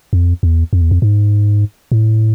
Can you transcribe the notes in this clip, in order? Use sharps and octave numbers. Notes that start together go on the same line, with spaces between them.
F2
E2
F2
E2
F2
G#2
A2